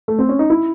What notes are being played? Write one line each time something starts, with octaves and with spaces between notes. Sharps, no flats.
A3
C4
C#4
D#4
E4